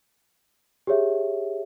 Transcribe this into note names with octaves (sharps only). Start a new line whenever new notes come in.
G4 G#4 C#5 E5